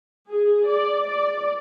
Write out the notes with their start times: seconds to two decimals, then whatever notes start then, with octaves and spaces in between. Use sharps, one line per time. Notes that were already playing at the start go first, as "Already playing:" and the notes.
0.29 G#4
0.68 D5
1.08 D5